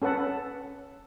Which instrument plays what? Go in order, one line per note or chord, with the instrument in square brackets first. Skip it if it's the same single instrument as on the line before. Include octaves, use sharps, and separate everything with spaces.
[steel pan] C#4 A4 B4 F#5 A5